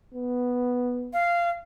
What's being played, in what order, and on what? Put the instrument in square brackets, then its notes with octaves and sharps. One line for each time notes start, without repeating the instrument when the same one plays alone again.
[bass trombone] B3
[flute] F5